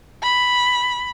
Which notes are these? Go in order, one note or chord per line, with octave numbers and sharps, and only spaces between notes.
B5